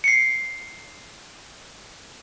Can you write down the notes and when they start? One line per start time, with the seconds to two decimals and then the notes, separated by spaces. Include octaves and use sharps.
0.04 C7 C#7